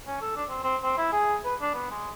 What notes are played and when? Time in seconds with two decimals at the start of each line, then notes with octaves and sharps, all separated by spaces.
0.07 C#4
0.21 A4
0.36 D4
0.49 C4
0.64 C4
0.84 C4
0.98 E4
1.12 G#4
1.45 B4
1.61 D4
1.74 B3
1.91 G#3